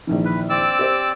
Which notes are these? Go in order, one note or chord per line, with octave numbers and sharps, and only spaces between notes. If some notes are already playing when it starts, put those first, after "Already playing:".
A#1 D#3 E3
B4
C4 D5 D6 E6
G4 C5